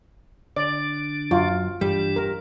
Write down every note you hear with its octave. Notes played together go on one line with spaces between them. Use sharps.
D3 D4 D5
F#2 F4
G2 E3 G3 D4
A#4